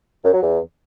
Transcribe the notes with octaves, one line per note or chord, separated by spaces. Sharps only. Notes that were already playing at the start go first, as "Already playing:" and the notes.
F#2
F#3
E2